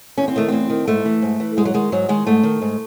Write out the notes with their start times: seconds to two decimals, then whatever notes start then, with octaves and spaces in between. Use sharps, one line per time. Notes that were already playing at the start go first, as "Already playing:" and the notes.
0.18 E2 C#4
0.28 C4
0.36 D#3 A3
0.48 E2 C4
0.70 D#3
0.88 G#2 A3
1.05 E3
1.22 G#2
1.40 E3
1.57 G#2 G#3
1.65 F#3
1.74 D#3 G#3
1.92 G#2 F#3
2.09 D#3 G#3
2.27 G#2 A3
2.43 D#3
2.62 G#2